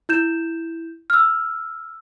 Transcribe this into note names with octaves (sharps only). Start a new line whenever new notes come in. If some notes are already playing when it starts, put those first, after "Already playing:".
E4 G6 E7
E6 F6